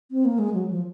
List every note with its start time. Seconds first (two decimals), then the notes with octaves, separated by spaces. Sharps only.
0.11 C4
0.25 A#3
0.39 G#3
0.54 F#3
0.71 F3